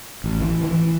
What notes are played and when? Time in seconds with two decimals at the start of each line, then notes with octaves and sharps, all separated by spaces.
0.24 A1
0.41 E3
0.64 E3